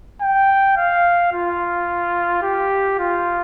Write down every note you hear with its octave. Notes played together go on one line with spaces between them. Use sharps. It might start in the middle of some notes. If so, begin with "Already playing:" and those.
G5
F5
F4
G4
F4